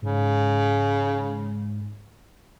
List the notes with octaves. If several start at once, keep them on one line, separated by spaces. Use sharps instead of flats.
G#2 C#3